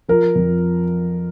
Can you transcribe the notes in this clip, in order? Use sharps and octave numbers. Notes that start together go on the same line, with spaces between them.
F3 A#4
F2